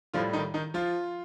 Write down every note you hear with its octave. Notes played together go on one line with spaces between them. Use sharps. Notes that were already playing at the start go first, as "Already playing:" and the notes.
A2 F3 G3 F4
D#3 D#4
D#3 D#4
F3 F4